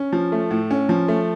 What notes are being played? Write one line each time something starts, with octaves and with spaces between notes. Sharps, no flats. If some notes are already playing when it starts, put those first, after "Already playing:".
Already playing: C#4
F3
A3
A2
C#4
F3
A3